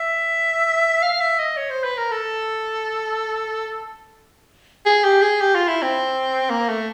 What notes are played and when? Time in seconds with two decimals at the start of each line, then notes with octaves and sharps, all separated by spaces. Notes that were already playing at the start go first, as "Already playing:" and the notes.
Already playing: E5
1.02 F5
1.20 E5
1.39 D#5
1.57 C#5
1.70 C5
1.84 B4
1.98 A#4
2.11 A4
4.86 G#4
5.04 G4
5.22 G#4
5.41 G4
5.55 F4
5.68 E4
5.82 C4
6.50 A#3
6.69 A3